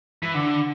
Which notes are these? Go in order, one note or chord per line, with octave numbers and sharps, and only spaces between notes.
E3
D3